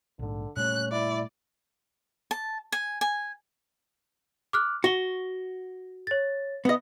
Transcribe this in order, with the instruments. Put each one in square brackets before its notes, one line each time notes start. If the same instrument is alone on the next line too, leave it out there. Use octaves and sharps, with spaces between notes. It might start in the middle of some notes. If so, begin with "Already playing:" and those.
[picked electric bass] A#1 G#2 [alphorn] D3
[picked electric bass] A#2 G3 A3 [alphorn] C#4 [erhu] F#6
[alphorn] E4 [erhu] D5
[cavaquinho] A5
G#5
G#5
[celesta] D6 F6 F#6
[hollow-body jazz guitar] F#4 [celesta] A#6 G7
[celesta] C#5 A6
[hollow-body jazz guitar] B3 D#5